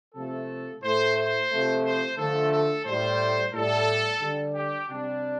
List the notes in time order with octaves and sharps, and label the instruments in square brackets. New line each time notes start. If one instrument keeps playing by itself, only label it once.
[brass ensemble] C3 F3 A3 A4
A2 A3 C5
C5
C3 F3 A3
C5
D3 F3 A3 A4
A4
A2 G3 C5
A2 G3 A4
D3 G3
G4
C3 G3 D4